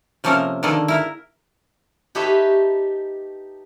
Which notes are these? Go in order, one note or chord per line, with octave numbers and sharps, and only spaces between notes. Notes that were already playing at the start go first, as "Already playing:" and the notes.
C3 F3 A#3 C#4 A4 A#4
D3 D#3 A#3 G#4 A4
E4 A#4
D#4 G4 A4 B4 C#5 E5